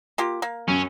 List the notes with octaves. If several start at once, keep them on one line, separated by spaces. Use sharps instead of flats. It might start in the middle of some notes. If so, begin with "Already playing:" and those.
A#3 F4 G4
A#3
F#2 C#4